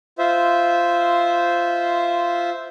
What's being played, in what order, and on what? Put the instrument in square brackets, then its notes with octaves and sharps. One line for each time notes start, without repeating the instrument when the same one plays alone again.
[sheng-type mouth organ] F4 C5 E5